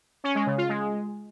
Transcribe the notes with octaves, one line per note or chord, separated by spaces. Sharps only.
C#4
G#3
C#3
F4
G#3